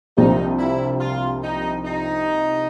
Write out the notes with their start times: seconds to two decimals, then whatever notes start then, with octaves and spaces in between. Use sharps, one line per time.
0.17 C2 C3 F3 A#3 D4 D#4
0.59 E4
1.00 F4
1.43 D#4
1.84 D#4